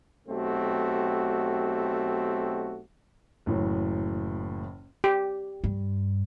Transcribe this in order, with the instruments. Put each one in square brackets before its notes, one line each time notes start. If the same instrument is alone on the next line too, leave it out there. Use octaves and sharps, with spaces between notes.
[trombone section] B1 A3 C4 F#4 G4
[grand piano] F#1 A2 E3 F#3
[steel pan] G4
[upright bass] G2